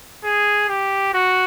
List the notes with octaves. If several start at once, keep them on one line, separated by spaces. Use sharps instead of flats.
G#4
G4
F#4